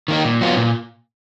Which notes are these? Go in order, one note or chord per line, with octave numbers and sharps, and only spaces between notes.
D#3 A#3 D#4
A#2
F#3 B3 F4
A#2